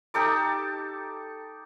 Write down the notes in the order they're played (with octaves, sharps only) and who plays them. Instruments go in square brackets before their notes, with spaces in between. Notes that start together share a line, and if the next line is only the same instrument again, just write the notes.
[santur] D#4 G4 A4 D6